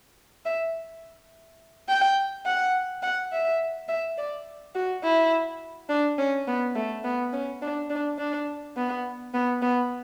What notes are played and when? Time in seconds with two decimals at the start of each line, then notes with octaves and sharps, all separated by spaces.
0.45 E5
1.89 G5
2.45 F#5
3.02 F#5
3.32 E5
3.88 E5
4.17 D5
4.75 F#4
5.03 E4
5.89 D4
6.18 C#4
6.47 B3
6.75 A3
7.04 B3
7.33 C#4
7.62 D4
7.90 D4
8.18 D4
8.76 B3
9.34 B3
9.62 B3